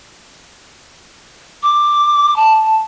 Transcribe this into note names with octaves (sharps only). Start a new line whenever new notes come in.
D6
A5